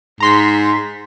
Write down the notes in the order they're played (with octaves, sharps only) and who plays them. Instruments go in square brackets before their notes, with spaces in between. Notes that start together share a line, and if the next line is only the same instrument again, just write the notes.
[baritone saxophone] G#2 [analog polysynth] A#5 C6 B6